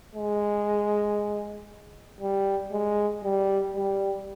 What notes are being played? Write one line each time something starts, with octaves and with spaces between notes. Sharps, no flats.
G#3
G3
G#3
G3
G3